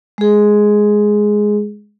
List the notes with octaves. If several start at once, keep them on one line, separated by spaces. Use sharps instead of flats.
G#3 G#4